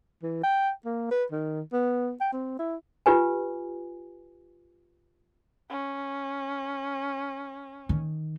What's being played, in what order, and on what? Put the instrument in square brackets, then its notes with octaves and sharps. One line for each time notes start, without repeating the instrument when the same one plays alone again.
[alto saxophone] E3
G5
A#3
B4
D#3
B3
G5
C4
E4
[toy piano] F4 G4 B4 G#5
[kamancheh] C#4
[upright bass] D#3